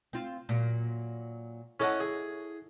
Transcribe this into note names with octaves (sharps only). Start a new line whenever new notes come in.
C4 F4
A#2 F#3
C#4 E4 A4 D#5 F#5
G#4